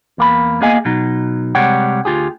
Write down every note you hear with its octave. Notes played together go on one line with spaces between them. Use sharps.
E2 A#3 B5
A#3 B3 G#4 D#5 F5 G#5
B2 F#3 D#4
C3 G3 G#3 C#5 F#5 G5
D2 F4 G4 G#4